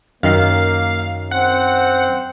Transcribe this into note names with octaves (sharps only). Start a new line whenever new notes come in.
F#2 D#3 A#3 F5 C7
C4 F#5